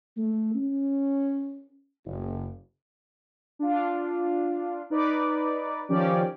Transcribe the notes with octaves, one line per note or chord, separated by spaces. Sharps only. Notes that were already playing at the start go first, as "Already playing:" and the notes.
A3
C#4
F#1
D4 F4
D#4 B4 D5
D#3 F3 C#4 G4 D5